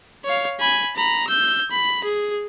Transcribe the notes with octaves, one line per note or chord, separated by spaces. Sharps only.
C#5 F5
G#5 B5
A#5 B5
E6 G6
B5
G#4